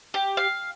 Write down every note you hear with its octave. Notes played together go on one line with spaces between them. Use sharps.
G4
F5